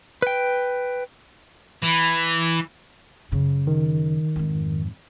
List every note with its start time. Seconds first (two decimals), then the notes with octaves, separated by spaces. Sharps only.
0.22 B4 G5
1.82 E3
3.32 F#2 C#3
3.67 D#3
4.36 F2 G#2